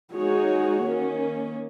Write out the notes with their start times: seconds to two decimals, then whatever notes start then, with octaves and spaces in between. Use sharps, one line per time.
0.14 G#3 D#4 F#4 G#4 C#5
0.85 D#3 A#3 C#4